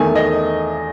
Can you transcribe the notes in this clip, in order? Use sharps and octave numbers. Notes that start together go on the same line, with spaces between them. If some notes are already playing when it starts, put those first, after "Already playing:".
Already playing: E2 D#3 A3 G#5
D#5